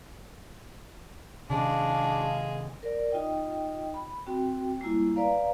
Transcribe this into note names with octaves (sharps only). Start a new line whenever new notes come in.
C3 D#3 G#3 C#4 D4 F5
A#4 D5
D#4 F4 D#5 G5
B5
C4 F#4 G5
G3 G#3 A#3 E4 F4
B4 D5 F5 A#5